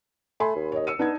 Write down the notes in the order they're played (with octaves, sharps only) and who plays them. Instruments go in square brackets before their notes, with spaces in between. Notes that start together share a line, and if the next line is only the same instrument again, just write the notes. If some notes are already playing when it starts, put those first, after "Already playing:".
[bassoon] A3 [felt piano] G#5 B5 C6
[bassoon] D#2
[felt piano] C#5 D#5
E6 C#7 D#7
[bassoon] B3 [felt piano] D4 D#4 G#6